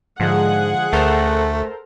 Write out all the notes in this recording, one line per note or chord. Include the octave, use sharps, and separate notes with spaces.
G#2 D3 F3 G#3 G#4 F#5
D2 A3 A4 A#4 C5